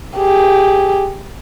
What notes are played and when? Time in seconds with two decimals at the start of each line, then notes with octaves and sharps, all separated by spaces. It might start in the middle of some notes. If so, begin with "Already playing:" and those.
0.17 G4 G#4